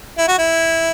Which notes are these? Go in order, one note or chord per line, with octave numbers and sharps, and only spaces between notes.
E4
F#4
E4